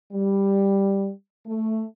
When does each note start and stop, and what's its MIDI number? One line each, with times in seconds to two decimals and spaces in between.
0.13 1.10 55
1.46 1.83 57